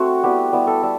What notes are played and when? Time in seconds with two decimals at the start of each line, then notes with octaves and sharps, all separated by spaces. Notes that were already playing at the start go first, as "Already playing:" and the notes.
Already playing: A3 C4 F#4
0.23 G3 B3 E4 G4
0.52 G3 B3 E4
0.67 A4
0.83 G3 A4